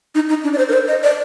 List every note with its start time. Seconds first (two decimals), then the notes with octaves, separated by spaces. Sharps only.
0.15 D#4
0.29 D#4
0.44 D4
0.53 D5
0.58 C5
0.69 A#4
0.73 C5
0.88 D#5
1.03 D5